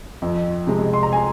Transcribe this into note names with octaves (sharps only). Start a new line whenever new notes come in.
F2
C3 G#3
C6
A#5
G#5